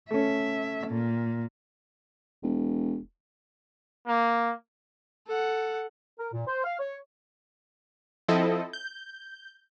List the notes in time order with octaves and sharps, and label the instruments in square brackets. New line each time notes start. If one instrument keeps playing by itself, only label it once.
[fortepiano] A3 C#4 [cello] E5
[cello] A#2
[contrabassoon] E1
[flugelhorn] A#3
[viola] A4 F#5
[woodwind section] A#4
A#2
C5
F5
C#5
[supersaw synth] F3 C4 E4 A4 D#5
G6